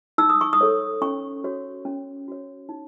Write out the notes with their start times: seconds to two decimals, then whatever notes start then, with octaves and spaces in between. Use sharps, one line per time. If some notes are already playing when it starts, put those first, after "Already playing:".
0.18 D#4 E6
0.30 D#6
0.41 C#6
0.53 D#6
0.61 A4 C#5
1.02 C#4 C#6
1.44 F#4 C#5
1.85 C#4
2.28 F#4 C#5
2.69 D#4